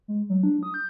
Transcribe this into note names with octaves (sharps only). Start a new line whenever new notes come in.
G#3
F#3
D4
D#6
G6